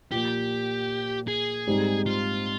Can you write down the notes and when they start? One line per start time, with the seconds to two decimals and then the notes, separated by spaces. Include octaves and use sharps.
0.11 A#2 F3 A#3 G4
1.28 G#4
1.67 G#2 G3 C4 D#4
2.06 F4